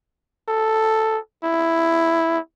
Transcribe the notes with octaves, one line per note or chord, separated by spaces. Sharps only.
A4
E4